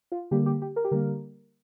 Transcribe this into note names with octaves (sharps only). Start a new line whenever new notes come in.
F4
D3 G3 A#3 G4
G4
G4
A#4
G4
D3 G3 A#3 A#4